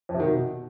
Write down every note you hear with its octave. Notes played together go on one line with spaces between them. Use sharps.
F2
C3
D#3
B2